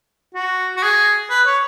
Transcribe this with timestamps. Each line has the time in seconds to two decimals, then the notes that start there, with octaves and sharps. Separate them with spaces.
0.34 F#4
0.76 F#4
0.83 G#4
1.30 B4
1.46 C#5